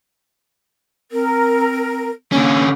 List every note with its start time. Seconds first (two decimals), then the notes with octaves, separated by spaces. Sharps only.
1.12 C4 A#4
2.32 D3 A#3 C#4